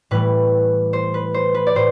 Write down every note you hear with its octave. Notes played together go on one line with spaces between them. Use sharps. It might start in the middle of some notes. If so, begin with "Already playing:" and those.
A2 E3 G3 B4
C5
B4
C5
B4
D5
A2 C5